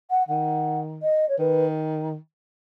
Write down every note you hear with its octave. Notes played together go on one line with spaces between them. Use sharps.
F#5
D#3 F#5
D#5
C#5
D#3 B4